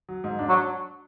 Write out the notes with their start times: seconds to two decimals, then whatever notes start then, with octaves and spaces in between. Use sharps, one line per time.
0.09 F#3
0.24 G#2
0.39 D4
0.49 F#3